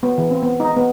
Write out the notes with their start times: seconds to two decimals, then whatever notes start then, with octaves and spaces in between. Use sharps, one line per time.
0.03 B3
0.18 E3
0.31 C4
0.43 B3
0.60 D#4
0.76 B3